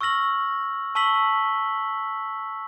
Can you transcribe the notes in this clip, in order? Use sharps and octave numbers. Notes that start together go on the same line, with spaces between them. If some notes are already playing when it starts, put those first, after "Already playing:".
C#6 E6 F6 A#6 F#7
A5 C#6 E6 B6 F#7 G7